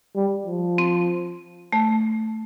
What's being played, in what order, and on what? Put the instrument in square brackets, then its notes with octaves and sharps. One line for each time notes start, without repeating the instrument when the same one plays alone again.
[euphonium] G3
F3
[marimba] C4
A3